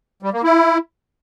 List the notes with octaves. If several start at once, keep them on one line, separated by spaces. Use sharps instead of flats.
G3
A#3
E4